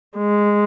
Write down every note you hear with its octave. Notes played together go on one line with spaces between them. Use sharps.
G#3